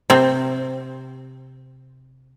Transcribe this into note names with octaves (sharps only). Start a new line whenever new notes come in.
C3 C4